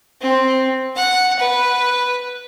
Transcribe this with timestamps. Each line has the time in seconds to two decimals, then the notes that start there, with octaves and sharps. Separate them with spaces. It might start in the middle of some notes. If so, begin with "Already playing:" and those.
0.21 C4
0.96 F#5
1.39 B4